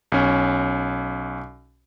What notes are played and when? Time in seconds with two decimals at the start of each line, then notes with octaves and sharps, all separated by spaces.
0.12 B1 C#4